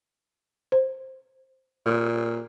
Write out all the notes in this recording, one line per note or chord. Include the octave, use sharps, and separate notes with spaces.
C5
A#2